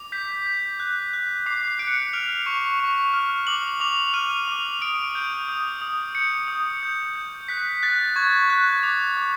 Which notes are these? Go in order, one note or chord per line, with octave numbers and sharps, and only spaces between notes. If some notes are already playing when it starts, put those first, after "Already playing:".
Already playing: D6
G6 B6
G6
F#6
F#6
D6 C7
F#6 D7
C#7
D7
F6 F7
C#6
C#6
F6
D6 F#7
D6 F7
F6 D#7
D6
D#6 D7
G6
D#6
D#6
G6 C#7
D#6
G6
G6
F#6 B6
F#6 A6
C#6 G#6
F#6
D6
D6